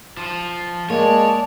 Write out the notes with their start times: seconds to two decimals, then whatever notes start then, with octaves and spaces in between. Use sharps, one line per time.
0.17 F3
0.90 G#3 A#3 C#5 D5 A5